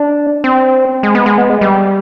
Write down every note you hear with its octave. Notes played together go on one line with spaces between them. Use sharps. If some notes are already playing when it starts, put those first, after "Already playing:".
Already playing: D4
C4
G#3
B3
G#3
B3
G#3
G3